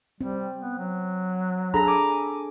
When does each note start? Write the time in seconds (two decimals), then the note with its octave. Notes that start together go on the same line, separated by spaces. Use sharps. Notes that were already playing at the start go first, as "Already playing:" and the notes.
0.21 G3 C4
0.60 B3
0.79 F#3
1.74 D4 G#4 A4 A#5 B5 A#6
1.87 G#5 D6